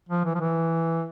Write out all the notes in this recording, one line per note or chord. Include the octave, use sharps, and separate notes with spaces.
F3
E3
F3
E3